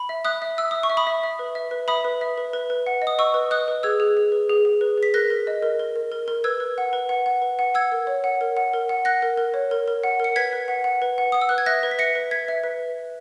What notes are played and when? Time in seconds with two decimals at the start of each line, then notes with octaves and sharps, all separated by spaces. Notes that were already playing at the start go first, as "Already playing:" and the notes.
Already playing: B5
0.09 E5
0.25 E5 D#6 F#6
0.42 E5
0.58 E5 E6
0.71 E5 D#6
0.83 C#6
0.90 E5
0.97 B5 D#6
1.07 E5
1.23 E5
1.39 B4
1.55 E5
1.71 B4
1.88 E5 B5 D#6
2.05 B4
2.21 E5
2.38 B4
2.53 B4
2.70 B4
2.86 F#5
3.02 D#5
3.07 D#6
3.18 D#5 C#6 E6
3.34 B4
3.51 D#5 D#6 F#6
3.68 B4
3.83 G#4 E6 G#6
4.00 G#4
4.17 G#4
4.32 B4
4.50 G#4
4.65 G#4
4.81 B4
4.98 G#4 B6
5.14 A#4 F#6 A#6
5.30 A#4
5.47 D#5
5.62 A#4
5.79 A#4
5.96 A#4
6.12 A#4
6.28 A#4
6.44 B4 E6 G#6
6.60 B4
6.78 F#5
6.93 B4
7.09 F#5
7.26 F#5
7.42 B4
7.59 F#5
7.74 F#5 E6 G#6
7.92 A#4
8.07 C#5
8.24 F#5
8.41 A#4
8.57 F#5
8.73 A#4
8.89 F#5
9.05 F#5 F#6 A#6
9.22 A#4
9.37 A#4
9.54 C#5
9.71 A#4
9.88 A#4
10.04 F#5
10.20 A#4 C#7
10.36 B4 G#6 B6
10.53 B4
10.68 F#5
10.84 F#5
11.02 B4
11.18 F#5
11.32 F#5 D#6
11.41 E6
11.49 B4 F#6
11.58 G#6
11.66 E5 F#6 A#6
11.83 B4
11.91 B6
11.99 E5 A#6 C#7
12.15 B4
12.31 B4 G#6 B6
12.48 E5
12.64 B4